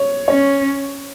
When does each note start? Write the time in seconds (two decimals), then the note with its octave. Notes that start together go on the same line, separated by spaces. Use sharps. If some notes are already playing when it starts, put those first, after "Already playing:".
Already playing: C#5
0.28 C#4 C#5